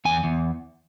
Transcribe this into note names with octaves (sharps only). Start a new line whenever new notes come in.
E2 G#5
E2